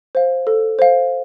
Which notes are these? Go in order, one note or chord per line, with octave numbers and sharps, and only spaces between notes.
C5 F5
A4
C5 F5